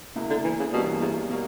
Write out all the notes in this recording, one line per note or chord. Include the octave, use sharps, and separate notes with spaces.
C#2 B2 A#3 E4
D3
E3
C#3
G2 B2 E3 G3 A#3 C#4
E2
B2 G3 A#3